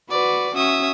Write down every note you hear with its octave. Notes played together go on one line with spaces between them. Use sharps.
F#4 B4 D5
C#4 F#4 E5 D#6